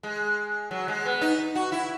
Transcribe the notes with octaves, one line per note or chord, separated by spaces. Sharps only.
G#3
F#3
G#3
B3
D#4
F#4
E4